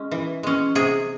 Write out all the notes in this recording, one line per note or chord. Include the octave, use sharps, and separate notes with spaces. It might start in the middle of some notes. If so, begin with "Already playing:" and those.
Already playing: G#3 C#4
E3
G#3 C#4
C3 G#4